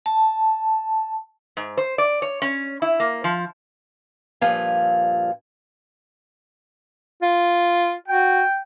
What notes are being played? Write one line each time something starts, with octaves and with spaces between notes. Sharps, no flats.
A5
G#2
C5
D5
C#5
C#4
E4
A#3
F3
G2 A#2 F3 G#5
F4
F#4 G5